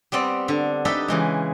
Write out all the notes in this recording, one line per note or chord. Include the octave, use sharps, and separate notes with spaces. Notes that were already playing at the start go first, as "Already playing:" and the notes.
G3 B3 C4 D5
D3
D#4 G4 A4 B4 E5
C#3 E3 G#3